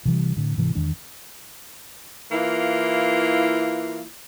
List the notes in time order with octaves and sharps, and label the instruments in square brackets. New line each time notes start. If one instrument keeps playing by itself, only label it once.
[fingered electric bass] C3 E3 G3
A2 D3
G#2 C3 E3 G#3
E2 D#3 G#3 D4
[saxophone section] E3 A#3 E4 F4